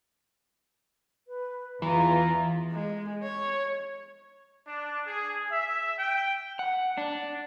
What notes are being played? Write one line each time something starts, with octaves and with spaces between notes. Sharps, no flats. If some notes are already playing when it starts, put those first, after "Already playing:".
B4
E2 E3 F4 A#5
G#3
C#5
D4
G#4
E5
G5
F#5
D4